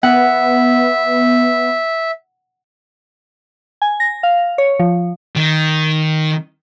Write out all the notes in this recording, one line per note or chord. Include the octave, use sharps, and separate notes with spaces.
B3 E5 F#5
G#5
A#6
F5
C#5
F3
D#3